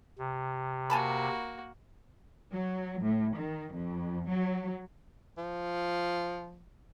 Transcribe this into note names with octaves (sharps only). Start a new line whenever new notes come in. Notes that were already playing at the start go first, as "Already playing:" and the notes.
C3
A#3 F#4 G#5 A5 B5
F#3
A2
D#3
F2
F#3
F3